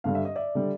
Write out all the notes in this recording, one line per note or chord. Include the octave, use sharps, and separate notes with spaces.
G2 D3 G3 F5
E5
D#5
D5 E5
D3 G3